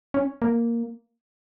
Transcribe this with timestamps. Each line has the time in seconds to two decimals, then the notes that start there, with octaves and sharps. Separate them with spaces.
0.14 C#4
0.42 A#3